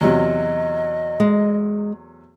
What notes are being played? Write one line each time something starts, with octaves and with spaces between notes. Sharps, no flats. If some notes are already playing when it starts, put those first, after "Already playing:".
E2 C3 F#3 D#5
G#3